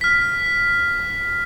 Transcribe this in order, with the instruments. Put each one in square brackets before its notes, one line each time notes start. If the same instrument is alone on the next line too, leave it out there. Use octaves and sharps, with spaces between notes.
[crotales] F6 B6